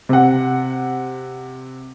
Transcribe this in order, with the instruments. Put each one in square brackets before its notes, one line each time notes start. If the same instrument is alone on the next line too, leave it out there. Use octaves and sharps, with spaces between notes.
[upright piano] C3 F#5